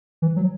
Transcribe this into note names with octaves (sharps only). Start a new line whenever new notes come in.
E3
F#3